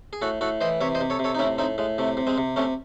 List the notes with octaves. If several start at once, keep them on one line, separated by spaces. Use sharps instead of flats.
G#4
A2 F#4 A4
A2 F#4 A4
E3 C5 D#5
C3 C#5 E5
C5 D#5
C3
A4 C#5
C3
A4 C#5
D#4
A2 C#4 E4
A2 C4 D#4
A2 G#3
C3 A3
C3
G#3 C4
C3
C3 A3 C#4